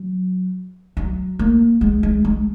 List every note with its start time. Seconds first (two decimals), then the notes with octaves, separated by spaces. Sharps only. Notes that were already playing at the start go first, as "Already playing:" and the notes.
Already playing: F#3
0.97 F#3
1.39 A#3
1.81 G#3
2.03 G#3
2.25 G#3